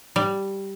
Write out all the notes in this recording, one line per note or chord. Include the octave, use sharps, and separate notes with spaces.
G3